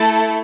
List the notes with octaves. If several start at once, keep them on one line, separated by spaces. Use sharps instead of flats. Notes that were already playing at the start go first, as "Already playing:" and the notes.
Already playing: A3 E4 A4